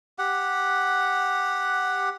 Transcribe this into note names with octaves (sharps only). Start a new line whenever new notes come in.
G4 F#5